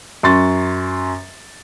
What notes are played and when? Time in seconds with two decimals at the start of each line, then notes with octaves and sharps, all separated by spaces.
0.23 F#2 C6 C#6 A6